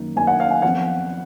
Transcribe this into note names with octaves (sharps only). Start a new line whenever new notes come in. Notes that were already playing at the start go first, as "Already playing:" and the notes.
Already playing: F#2 D#3 A#3
F#2 D#3 A#3 G#5
F#5
F5
G#5
F2 F3 B3 F#5